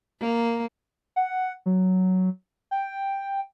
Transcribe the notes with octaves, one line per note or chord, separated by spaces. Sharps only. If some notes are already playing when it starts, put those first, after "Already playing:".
A#3
F#5
F#3
G5